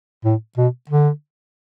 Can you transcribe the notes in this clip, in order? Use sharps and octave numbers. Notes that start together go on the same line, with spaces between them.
A2
B2
D3